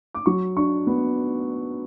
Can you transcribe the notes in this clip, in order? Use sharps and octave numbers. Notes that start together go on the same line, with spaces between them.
D6
F#3 C#6
D4 C#6
B3